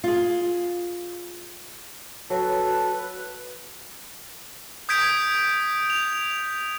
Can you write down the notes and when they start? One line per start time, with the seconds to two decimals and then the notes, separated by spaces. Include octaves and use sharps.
0.04 F4 G#4
2.30 F#3 F#4 A4 B4
4.89 D#6 G6 G#6 B6 D7
5.90 F7